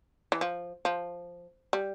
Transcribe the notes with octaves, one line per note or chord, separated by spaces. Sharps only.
E3
F3
F3
G3